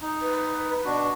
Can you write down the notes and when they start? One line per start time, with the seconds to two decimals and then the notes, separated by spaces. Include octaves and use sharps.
0.02 D#4
0.22 B4
0.85 B2 D4 F#4